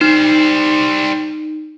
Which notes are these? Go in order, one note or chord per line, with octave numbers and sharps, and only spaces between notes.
G3 D#4 C5